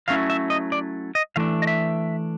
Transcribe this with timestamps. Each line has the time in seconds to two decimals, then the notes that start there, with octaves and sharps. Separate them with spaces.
0.08 F#3 A3 C#4 E4 F5
0.30 E5
0.50 D#5
0.72 D5
1.15 D#5
1.36 E3 A3 D4 F5
1.62 D#5
1.67 E5